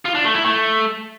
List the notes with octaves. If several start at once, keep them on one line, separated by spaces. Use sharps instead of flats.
F4
D4
A3
E4
A3